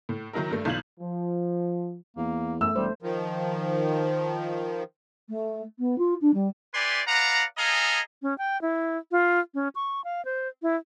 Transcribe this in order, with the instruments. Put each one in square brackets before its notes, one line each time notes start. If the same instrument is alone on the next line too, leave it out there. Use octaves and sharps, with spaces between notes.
[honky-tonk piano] A2
D#3 F#3 D#4 E4 A#4
G2 A3
B1 E3 F4 G6 G#6 F#7
[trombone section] F3
[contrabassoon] E2 [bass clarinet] A#3
[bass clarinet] F#2 [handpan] A3 [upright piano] E6
[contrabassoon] E1 [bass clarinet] G3 [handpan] C5
[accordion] D#3 F3
[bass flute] A3
B3
F4
D4
G3
[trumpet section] E4 G4 B4 D5 G#5 C6
B4 D5 F5 F#5 A#5
G#4 A4 D#5 F5 G#5 A#5
[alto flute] C#4
G5
E4
F4
C#4
C#6
F5
C5
E4